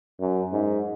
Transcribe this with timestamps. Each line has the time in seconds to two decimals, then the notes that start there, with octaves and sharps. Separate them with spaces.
0.20 F#2
0.52 G#2